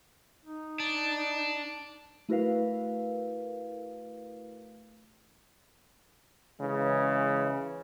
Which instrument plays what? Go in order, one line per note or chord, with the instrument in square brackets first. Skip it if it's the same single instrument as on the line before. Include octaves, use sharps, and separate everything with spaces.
[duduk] D#4
[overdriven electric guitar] D4
[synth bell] A3 E4 F#4 A#4 B4 F5
[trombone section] C#3 E3 G#3